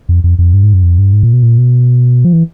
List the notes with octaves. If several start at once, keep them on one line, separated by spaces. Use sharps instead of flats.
F2
F2
F2
G2
G#2
F#2
F2
G2
G#2
A#2
B2
A#2
B2
F3
E3